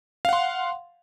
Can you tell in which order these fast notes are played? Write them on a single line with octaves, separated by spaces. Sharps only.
F5 F#5 C6